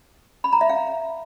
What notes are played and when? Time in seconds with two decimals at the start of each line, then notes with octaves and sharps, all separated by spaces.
0.44 B5
0.53 A#5
0.61 E5
0.69 F5